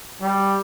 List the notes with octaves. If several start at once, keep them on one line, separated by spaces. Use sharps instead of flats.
G3